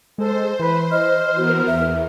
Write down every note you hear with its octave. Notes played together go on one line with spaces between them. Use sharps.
G#3 A4 C5
E3 B4
D#5 F6
B3 F#4 A#4
E2 E5